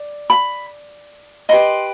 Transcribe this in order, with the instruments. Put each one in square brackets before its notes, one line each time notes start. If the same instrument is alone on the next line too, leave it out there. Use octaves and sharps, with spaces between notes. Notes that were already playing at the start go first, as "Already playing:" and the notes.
Already playing: [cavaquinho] D5
B5
G4 B4 D#5 C6